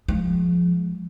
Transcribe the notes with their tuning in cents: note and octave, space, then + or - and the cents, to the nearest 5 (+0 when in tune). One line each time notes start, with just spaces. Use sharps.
F3 +5 G#3 +0